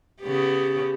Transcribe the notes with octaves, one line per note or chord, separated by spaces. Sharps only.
C#3 B3 G4